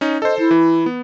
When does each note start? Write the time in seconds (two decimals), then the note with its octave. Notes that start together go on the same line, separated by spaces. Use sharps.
0.01 C#4 D#4
0.22 A4 C5 D#5
0.39 E4
0.51 E3
0.86 B3